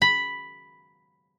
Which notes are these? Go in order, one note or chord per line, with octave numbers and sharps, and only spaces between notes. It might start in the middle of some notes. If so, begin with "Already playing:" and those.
B5